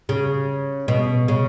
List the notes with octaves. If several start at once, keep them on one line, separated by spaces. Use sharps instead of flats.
C#3
B2
C#3